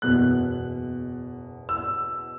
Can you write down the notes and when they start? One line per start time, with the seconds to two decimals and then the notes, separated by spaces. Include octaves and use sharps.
0.02 F#1 E2 B2 F#6
1.69 E6